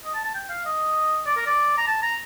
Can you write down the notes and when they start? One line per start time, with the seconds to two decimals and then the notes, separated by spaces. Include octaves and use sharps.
0.05 D#5
0.14 A5
0.25 A5
0.35 G5
0.49 F5
0.65 D#5
1.26 D5
1.37 A#4
1.46 D5
1.78 A#5
1.87 A5
2.02 A#5